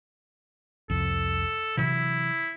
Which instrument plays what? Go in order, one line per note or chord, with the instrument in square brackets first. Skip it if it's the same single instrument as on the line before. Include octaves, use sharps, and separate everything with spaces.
[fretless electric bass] C2 F2 [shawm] A4
[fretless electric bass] C3 E3 F#3 [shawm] E4